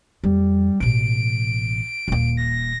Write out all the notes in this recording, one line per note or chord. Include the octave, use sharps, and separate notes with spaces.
F2 G3
A1 B2 D7
D#1 A#3
A#6